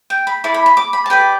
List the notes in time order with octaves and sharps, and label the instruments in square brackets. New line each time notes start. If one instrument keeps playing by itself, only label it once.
[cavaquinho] G5
B5
E4 A4 D5 D6
B5
B5
D6
B5
A5
G4 B4 D5 G5